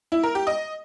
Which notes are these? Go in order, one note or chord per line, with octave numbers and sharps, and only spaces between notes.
E4
A#4
G4
D#5